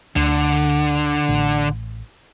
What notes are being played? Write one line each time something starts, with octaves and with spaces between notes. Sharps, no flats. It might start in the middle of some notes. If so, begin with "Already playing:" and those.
D2 D3
A1